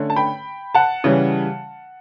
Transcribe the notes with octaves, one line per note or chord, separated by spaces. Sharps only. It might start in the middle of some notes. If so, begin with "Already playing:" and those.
Already playing: D3 A3 C#4
A5
G5 B5
F#5 A5
C#3 E3 G3 C#4